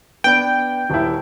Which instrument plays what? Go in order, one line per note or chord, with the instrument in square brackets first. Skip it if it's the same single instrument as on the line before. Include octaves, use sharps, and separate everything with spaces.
[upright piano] B3 D4 B4 [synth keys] G5
[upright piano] D#1 E4